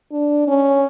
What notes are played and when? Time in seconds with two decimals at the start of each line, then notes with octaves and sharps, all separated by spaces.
0.12 D4
0.48 C#4